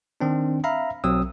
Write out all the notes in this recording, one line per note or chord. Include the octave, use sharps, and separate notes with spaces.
D#3 C4 D4
E5 F5 A#5 B5
B1 F#3 C4 D#6 E6